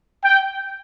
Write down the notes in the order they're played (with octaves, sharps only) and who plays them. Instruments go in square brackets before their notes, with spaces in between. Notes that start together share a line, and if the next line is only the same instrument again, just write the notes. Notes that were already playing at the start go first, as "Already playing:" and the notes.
[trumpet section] G5